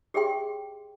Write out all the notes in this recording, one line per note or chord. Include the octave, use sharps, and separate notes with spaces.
G4 G#4 C#5 E5 G5 C6